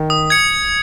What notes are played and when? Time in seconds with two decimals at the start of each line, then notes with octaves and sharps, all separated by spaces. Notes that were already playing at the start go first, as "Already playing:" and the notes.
Already playing: D#3
0.10 D#6
0.30 G#6 C#7